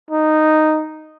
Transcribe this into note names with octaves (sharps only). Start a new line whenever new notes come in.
D#4